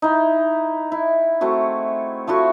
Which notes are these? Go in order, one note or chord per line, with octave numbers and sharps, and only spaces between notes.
D#4 E4
E4
A3 C4 F#4 G#4
F3 A3 E4 F#4